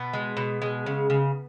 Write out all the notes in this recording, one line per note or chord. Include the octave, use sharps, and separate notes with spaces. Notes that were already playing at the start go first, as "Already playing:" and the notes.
Already playing: B2 B3
G#3
B2
G#3
C#3
C#3